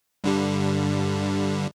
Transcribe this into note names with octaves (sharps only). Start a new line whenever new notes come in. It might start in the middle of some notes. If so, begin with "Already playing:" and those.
G2 D3 G3